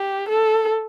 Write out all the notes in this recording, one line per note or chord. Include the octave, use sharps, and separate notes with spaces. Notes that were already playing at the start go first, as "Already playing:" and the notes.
Already playing: G4
A4